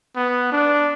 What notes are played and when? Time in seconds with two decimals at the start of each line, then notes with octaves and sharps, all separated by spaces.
0.16 B3
0.52 D4